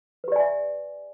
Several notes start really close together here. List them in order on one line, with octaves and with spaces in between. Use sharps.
B4 G4 D5 G#5 E5